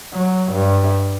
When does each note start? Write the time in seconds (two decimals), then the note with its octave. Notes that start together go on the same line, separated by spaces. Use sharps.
0.13 F#3
0.52 G2